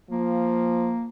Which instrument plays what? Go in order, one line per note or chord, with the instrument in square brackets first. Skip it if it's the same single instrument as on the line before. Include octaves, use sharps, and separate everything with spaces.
[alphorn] F3 [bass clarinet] A#3